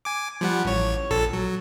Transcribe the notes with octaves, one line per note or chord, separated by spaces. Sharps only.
G#5 D6
F3 G3 F#5
A1 C#5
A#1 A4 A5
F#3